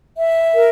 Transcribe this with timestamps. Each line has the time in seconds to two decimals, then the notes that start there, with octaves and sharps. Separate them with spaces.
0.17 E5
0.53 A#4